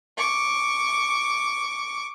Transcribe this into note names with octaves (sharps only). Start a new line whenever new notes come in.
C#6 D6